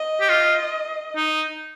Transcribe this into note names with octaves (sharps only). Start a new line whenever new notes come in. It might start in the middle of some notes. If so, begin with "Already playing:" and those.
Already playing: D#5
G4
F4
D#4